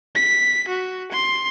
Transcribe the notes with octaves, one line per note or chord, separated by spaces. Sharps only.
B6
F#4
C6